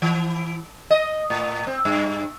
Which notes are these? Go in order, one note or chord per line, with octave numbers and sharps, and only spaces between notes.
E3
D#5
A2
C4
G2